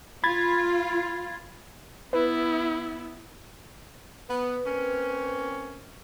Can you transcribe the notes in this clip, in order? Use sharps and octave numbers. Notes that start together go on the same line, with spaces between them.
F4 B5 G#6 A6
B3 E4 B4
B3 B4
A#3 C4 C#4